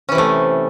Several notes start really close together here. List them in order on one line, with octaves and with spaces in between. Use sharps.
C#4 E3 C3 A3